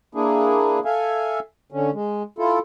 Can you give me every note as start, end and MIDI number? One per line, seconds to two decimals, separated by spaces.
0.15 0.79 58
0.15 0.79 62
0.15 0.79 64
0.15 0.79 68
0.85 1.39 69
0.85 1.39 76
0.85 1.39 77
0.85 1.39 80
1.72 1.90 50
1.72 1.90 61
1.94 2.23 56
2.39 2.59 64
2.39 2.59 65
2.39 2.59 69